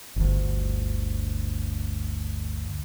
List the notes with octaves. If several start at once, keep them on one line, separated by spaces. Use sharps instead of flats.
G1 D2